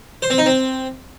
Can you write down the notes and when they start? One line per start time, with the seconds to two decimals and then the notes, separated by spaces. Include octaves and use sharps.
0.22 C5
0.30 C4
0.38 D#4
0.46 C4